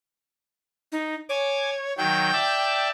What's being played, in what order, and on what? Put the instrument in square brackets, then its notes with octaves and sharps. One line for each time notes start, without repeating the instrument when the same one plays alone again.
[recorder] D#4
[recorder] C#5 [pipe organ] G#5 D6
[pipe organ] D#3 F#3 [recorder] G5
[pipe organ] D5 E5 A5